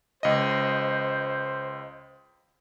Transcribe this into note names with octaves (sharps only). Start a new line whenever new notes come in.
C#2 C5 D#5